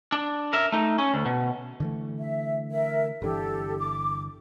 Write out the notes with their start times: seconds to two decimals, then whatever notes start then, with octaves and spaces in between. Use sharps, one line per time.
0.12 D4
0.53 A#4 E5
0.72 A3 D#4
0.98 C#4
1.14 D2
1.26 B2
1.80 D3 E3 A3
2.19 E5
2.71 A#4 E5
3.22 G1 D3 E3 G4 A4
3.78 D6